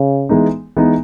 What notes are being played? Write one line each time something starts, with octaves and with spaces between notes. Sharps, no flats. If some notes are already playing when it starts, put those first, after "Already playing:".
Already playing: C#3
E3 G#3 B3 D#4
E3 G#3 B3 D#4